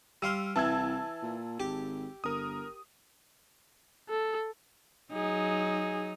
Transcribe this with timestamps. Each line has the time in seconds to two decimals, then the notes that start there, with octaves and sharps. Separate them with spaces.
0.22 G3 F5 C6 E6 F6
0.56 C2 E3 A5 E6 G#6
1.23 A#2
1.60 G#1 G4
2.24 G1 A#4 D#6
4.09 A4
5.13 F#3 D#4 G#4